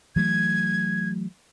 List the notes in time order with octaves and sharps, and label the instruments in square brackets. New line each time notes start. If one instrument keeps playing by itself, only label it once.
[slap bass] E3 F#3 A3 [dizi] G#6